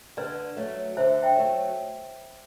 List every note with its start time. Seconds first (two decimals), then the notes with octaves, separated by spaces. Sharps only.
0.17 D3 B4 D5
0.57 F#3 A3
0.97 D3 C5 E5
1.22 E5 G5
1.36 F#3 A3